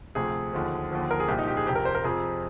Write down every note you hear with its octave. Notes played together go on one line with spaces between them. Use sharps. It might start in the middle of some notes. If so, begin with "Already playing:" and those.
D2 C3 F3 G#4
D#2 D3 F3
D#2 D3 F3
A#4
G#4
C2 A#2 F3 G4
D#4
G4
G#4
F2 C3 F3 G4
A#4
C5
A#4
F2 C3 F3 G#4